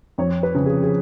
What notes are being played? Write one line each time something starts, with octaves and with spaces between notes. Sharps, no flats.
F2 C#5
B4
C#3 F3
G#4
G#4